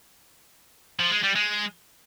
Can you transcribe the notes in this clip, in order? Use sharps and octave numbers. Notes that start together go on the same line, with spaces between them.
F3
G#3
G3
G#3